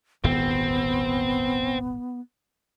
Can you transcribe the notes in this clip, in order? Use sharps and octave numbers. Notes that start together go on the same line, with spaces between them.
D#1 G#1 E2 B3 C4